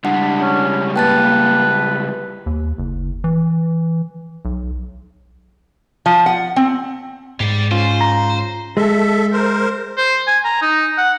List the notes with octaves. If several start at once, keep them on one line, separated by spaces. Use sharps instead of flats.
C#2 G3 D4 F#5
C#4
A#3 B4 G5 A5 A6
D#2
F#1
E3
B1
F3
F#5
C4
G#2 G4 D5
C#4 F4 C5
A#5
G#3 A4 E5
A#4 C5
C5
G#5
A#5
D#4
F#5